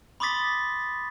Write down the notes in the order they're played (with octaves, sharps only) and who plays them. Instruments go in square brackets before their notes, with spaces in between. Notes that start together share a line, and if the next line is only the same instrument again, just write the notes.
[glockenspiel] B5 C6 D6 D#6 A6 B6